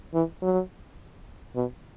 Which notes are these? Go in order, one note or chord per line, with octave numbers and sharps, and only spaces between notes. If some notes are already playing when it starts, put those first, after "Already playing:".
E3
F#3
B2